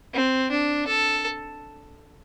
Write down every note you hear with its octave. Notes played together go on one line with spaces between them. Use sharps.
C4
D4
A4